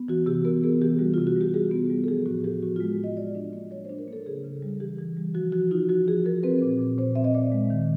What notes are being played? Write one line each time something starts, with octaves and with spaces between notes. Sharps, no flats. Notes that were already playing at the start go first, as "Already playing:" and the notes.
Already playing: B3
E3 F#4
C3 G4
B3 A#4
B3 G#4
E3 G4
G3 F#4
C3 F4
F#4
G3 G4
G3 G#4
B3
G3
A4
F3 G#4
A2 F#4
F3 G4
A2 F#4
G#3 F4
A2 D#5
F#3 D5
D4
A#3
F#3 C#5
D4 C5
A#4
A#3 A4
C#3 G#4
C#3
G3
E3 G4
E3
G3
F3 F#4
F3 F#4
D#4 F4
F3 F#4
F3 G#4
F3 A#4
C4 B4
A#2
A#2
A#2 C5
C4 E5
D#5
A#2 D5
G#3
D#3